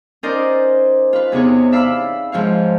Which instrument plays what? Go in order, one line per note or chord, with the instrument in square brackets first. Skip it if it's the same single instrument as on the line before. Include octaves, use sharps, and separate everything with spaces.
[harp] C#4 D#4 A#4 C5 D5 D#5
F4 B4
E2 C3 D#4 G#4 C#5
D5 E5 F5 B5 E6
G#2 F3 C#5 F5